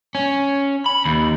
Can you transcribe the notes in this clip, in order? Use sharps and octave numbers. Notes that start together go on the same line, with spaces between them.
C#4
B5
D#2